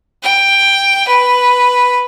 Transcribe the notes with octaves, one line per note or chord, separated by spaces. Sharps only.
G5
B4